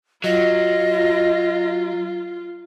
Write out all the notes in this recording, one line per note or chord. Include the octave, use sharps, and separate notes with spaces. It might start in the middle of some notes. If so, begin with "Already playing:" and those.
F#3 F4 D#5